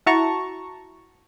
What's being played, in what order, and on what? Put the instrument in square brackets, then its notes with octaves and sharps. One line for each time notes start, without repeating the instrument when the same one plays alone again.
[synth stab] E4 F#4 A5 A#5 C#6